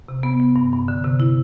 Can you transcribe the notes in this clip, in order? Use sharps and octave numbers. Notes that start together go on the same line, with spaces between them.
C3
B3
B3
G2
G2
D3
C3
E4